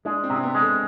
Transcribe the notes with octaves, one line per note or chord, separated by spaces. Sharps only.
G#3 D4
C4
C3
C4
B3
G#3
A4